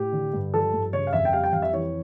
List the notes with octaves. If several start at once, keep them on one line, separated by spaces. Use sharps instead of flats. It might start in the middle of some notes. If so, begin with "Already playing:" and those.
Already playing: A2 G4
D3
G2
F3 A4
G2
C#3 C#5
F5
F2 E5
G5
G3 F5
G5
F2 F5
E5
E3 C#5